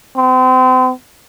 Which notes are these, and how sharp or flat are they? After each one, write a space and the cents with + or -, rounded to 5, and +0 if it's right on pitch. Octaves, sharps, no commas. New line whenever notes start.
C4 -35